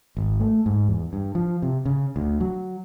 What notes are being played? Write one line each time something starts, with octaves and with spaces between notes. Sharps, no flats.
G#1
A3
G#2
E2
G2
F3
C3
C#3
D2
F#3